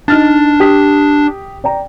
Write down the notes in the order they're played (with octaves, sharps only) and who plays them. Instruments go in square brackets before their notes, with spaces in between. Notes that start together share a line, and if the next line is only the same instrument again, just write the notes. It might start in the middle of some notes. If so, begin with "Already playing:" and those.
[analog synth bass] D4 [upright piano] D#4 F6 A6
[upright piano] G4 D#6 B6
D5 G5 A#5